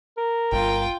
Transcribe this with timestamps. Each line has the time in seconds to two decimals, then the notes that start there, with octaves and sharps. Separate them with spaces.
0.17 A#4
0.52 G1 F4 G5